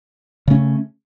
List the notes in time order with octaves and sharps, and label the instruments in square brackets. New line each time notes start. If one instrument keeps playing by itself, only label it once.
[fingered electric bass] C#3 A3 C#4